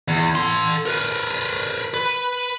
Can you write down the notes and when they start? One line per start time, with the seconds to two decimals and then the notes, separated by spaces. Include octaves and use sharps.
0.08 E2
0.35 A4 C6
0.86 A#4 B4
1.94 B4